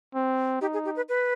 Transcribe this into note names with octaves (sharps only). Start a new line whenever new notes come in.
C4
D#4 G4
G#4
G4
B4
B4